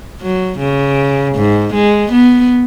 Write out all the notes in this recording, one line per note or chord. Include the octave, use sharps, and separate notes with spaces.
F#3
C#3
G#2
G#3
B3